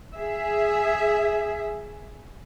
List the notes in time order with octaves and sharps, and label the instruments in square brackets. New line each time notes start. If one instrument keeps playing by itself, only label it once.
[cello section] G#4 E5